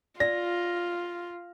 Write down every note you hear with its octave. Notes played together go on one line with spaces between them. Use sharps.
F4 D5 A#6